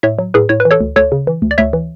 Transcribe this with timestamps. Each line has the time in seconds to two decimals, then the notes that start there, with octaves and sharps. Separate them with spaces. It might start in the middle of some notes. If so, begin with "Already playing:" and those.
0.03 A2 C#5 E5
0.19 F#3
0.34 A2 G#4 B4
0.49 A2 C#5
0.60 B4
0.65 E3
0.71 A4 C#5
0.81 D2
0.96 D2 A4 C#5
1.12 C#3
1.27 E3
1.42 D2
1.51 D5
1.58 D2 C#5 E5
1.73 E3